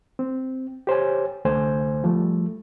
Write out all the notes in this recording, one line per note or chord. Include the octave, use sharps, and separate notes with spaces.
C4
G4 C5 C#5 G#5
C2 D3 A3 C5 G#5
F3 G3 A3